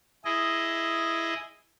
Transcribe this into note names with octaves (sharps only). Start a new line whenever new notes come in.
E4 G#4 D#5